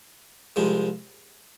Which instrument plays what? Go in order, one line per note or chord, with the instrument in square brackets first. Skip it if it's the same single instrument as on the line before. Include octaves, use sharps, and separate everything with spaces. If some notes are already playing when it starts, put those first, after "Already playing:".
[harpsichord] C2 C3 F3 G#3